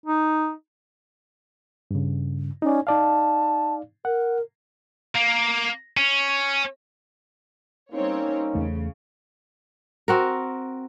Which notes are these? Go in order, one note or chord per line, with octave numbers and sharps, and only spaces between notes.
D#4
G2 C#3
C#4 D#4 D5
D#4 D5 F5 A5
A#4 F#5
A#3
C#4
G3 A#3 C4 C#4 D#4 C#5
E2 C#3 A3
C4 F#4 A#4